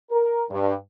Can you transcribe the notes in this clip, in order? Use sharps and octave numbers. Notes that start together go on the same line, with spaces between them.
A#4
G2